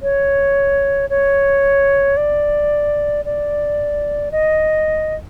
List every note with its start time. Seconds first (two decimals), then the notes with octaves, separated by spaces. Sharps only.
0.02 C#5
1.10 C#5
2.17 D5
3.25 D5
4.32 D#5